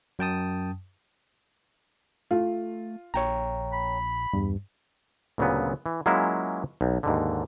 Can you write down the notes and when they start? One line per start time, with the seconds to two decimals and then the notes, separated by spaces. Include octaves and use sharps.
0.19 F#2 G5 A5 D#6
2.31 A3 F4
3.14 A#1 C#5 G5 A#5
3.72 B5
4.33 E2 G2
5.38 D2 A#2 C#3 F#3 B3
5.86 E3
6.06 F#3 G#3 A#3 C#4 E4 F4
6.81 B1
7.03 D#2 G#2 D3